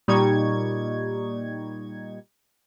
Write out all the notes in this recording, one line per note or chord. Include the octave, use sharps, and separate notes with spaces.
A#2 G3 D#4 C#6 G#6